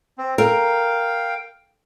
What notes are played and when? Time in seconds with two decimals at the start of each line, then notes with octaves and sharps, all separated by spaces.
0.18 C4
0.38 A#4 F5 G5